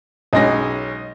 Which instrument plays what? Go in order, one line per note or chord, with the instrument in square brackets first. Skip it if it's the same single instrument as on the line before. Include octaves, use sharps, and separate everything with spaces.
[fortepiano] B1 G#3 C#4 [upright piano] D#5 A#6